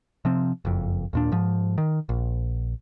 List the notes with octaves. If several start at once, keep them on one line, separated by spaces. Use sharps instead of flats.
C3 F3 C4
F#1 F2
D#2 A#2 D4
G#2 F3
D#3
A#1